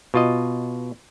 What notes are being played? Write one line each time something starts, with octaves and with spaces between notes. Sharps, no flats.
B2 F4 D#5